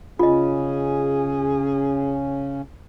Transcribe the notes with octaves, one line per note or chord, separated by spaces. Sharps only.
C#3 C#4 F4 G#4 D#5